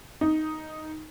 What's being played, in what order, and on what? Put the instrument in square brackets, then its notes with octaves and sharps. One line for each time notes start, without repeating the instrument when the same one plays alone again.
[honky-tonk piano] D#4